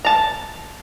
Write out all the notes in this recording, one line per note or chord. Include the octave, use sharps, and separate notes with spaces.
A5 A#5